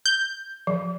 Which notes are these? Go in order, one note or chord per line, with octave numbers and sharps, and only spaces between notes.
G6
F3